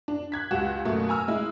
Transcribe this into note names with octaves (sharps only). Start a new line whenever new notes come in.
D4
F#6 G#6 B6
C#2 F#4 G4 E7
F#2 B2 A3 A#3
G#5 A#5 E6 F6
G#3 E4